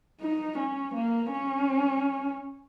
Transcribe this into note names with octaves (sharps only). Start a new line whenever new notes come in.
D#4
C#4
A#3
C#4